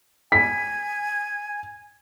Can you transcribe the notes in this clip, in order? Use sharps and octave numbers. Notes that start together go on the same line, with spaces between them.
G#5 B6